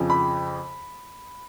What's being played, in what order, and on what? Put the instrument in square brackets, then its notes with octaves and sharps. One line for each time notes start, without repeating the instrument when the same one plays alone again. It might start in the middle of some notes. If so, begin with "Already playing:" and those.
Already playing: [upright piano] F2 C#3 F3
B5